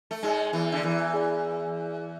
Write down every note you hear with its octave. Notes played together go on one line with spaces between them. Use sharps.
A3
G#2 G#3 G#4 D5 G#5
E2 E3
D3
E2 E3
G#4 D5 G#5